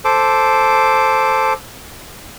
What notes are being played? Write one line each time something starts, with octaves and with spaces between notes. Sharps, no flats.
A4 C5 D6